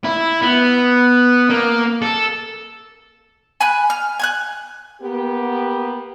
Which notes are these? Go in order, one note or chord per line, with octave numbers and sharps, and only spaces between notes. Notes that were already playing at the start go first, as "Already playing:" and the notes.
E4
B3
A#3
A4
G#5 B5 F#6
F6
G#5 F6 F#6
A#3 B3 G4